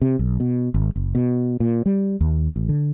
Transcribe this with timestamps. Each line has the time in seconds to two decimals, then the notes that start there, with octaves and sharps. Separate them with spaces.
0.02 C3
0.19 B1
0.40 B2
0.74 G#1
0.96 F#1
1.15 B2
1.60 A#2
1.86 G3
2.21 D#2
2.56 A1
2.69 D3